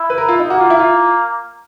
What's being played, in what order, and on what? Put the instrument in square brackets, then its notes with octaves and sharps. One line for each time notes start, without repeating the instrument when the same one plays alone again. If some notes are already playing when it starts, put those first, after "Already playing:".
Already playing: [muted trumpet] E4
[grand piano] B4
A#4
F4
D#4
[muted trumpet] A#3 [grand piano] F#4
[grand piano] F4
E4
F4